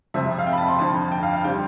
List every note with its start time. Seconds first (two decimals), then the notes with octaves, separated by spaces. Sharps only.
0.14 F2 C3 F3 E5
0.39 F5
0.47 G5
0.53 B5
0.57 A5
0.68 C6
0.79 F2 D3 F3 A5
1.12 G5
1.23 F5
1.33 F5
1.44 D3 G3 C4 G5